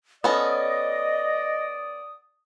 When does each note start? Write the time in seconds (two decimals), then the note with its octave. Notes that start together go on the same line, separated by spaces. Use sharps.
0.24 B3 C#4 A4 D5 D#5 D#6